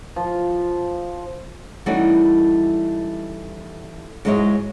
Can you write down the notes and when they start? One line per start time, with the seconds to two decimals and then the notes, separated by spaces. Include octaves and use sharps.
0.16 F3
1.86 E3 G3 A3 C#4 D#4 F#4
4.25 G#2 F#3 G#3 E4 C#5 D#5